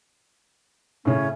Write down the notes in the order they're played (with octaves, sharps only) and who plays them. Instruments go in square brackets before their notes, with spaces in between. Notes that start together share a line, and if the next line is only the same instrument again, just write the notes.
[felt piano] A2 C#3 [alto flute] C#4